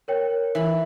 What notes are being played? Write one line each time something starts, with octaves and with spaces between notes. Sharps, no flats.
A#4 C#5 G5
E3 B5